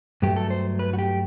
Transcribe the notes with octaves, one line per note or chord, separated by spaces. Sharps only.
G2 F#3 A3 G4
A4
C5
B4
F#4
G4